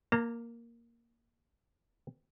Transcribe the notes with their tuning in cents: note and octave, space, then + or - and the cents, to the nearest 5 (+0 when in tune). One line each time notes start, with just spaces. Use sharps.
A#3 +0 A#5 -40